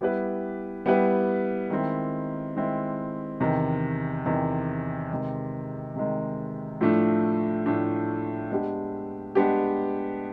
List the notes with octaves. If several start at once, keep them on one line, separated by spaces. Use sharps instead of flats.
G3 B3 E4 G4 B4
G3 B3 E4 G4 B4
D#3 G#3 C4 E4
D#3 G#3 C4 E4
E2 C3 D#3
E2 C3 D#3
C3 D#3 G#3
C3 D#3 G#3
A2 F3 A3 D4
A2 F3 A3 D4
G#3 B3 D4 G4
G#3 B3 D4 G4